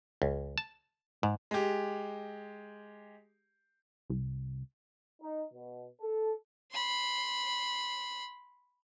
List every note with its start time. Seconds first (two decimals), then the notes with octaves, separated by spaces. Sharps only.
0.22 C#2
0.58 A5
1.23 G#2
1.51 G#3 G4
4.10 C2
5.22 D#4
5.54 B2
6.01 A4
6.72 B5 C6